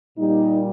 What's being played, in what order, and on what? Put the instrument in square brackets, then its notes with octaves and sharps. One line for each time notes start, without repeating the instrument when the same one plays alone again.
[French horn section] A#2 G3 D#4